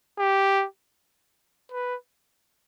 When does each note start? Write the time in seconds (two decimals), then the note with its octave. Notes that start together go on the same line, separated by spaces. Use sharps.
0.19 G4
1.72 B4